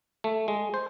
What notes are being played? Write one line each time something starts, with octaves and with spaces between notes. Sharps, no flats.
A3
G#3
C5